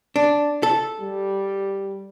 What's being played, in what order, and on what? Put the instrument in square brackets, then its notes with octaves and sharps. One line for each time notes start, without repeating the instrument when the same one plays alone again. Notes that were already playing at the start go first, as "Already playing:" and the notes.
[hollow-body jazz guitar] D4
A4
[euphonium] G3